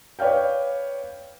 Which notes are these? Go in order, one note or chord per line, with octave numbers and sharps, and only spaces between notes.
B4 C#5 D5 F5 G5